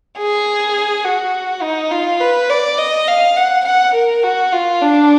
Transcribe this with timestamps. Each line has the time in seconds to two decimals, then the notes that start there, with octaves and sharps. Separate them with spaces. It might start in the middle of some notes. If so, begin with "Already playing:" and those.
0.18 G#4
1.05 F#4
1.63 D#4
1.91 F4
2.21 B4
2.50 D5
2.78 D#5
3.08 F5
3.36 F#5
3.65 F#5
3.94 A#4
4.23 F#4
4.52 F4
4.82 D4